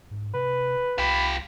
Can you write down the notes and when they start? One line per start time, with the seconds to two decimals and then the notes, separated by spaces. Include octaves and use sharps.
0.11 G#2
0.34 C3 B4
0.98 C2 F4 G4 B5